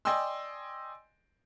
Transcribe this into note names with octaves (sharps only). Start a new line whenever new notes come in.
D5 D#5 G5 G#5 C6 E6